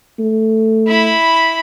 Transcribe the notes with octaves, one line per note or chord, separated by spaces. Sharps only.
A3
E4 B5